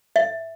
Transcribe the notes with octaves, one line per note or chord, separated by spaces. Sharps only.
E5